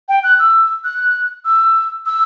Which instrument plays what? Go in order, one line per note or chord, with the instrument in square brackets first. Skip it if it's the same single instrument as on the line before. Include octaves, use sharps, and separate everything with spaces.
[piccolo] G5
F#6
E6
F#6
E6
E6